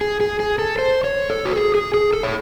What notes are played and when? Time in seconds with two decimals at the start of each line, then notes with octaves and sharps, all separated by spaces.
0.01 G#4
0.20 G#4
0.40 G#4
0.59 A4
0.79 C5
1.04 C#5
1.30 A4
1.45 F#4
1.56 G#4
1.75 G#4
1.94 G#4
2.13 A4
2.23 C#5